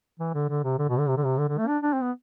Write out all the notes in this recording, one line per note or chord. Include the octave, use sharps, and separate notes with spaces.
E3
D3
D3
C3
D3
B2
D3
C3
D3
C3
D3
D3
A3
D4
D4
C4
B3